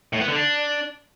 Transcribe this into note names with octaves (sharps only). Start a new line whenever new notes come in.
A2
B3
D3
D4